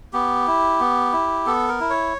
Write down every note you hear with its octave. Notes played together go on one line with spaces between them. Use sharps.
B3 G4
E4
B3
E4
B3 A4
A#4
E4
C#5